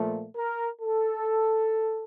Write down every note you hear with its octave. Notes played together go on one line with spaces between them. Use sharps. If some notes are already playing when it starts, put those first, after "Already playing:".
Already playing: A#2 F3 A3
A#4
A4